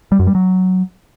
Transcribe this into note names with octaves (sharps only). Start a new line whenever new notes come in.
G3
F#2
G3
F#3